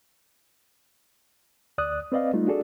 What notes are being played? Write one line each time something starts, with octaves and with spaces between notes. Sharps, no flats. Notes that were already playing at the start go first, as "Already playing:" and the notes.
D2 D5 D#6 F#6
C4 B4 D5 D#5 F5
G3 A3 D#4 F4
D4 F#4 G#4 A4 D5